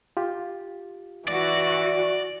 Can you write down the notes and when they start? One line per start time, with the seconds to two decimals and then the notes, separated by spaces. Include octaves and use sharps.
0.17 F4 G4
1.28 E3 F#4 D5